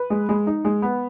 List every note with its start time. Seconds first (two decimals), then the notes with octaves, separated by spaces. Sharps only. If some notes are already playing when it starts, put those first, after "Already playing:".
Already playing: B4
0.10 G#3
0.29 G#3
0.47 D#4
0.65 G#3
0.82 B3